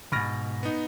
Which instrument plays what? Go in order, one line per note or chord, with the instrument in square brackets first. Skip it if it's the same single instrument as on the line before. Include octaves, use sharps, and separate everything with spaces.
[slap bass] G#2 B2 [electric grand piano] B5 F6 A#6
[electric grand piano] B3 D#4